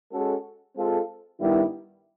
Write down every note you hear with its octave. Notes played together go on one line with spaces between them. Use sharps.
G#3 C#4 F#4 A4
G#3 C4 F4 A4
G2 D#3 G3 B3 E4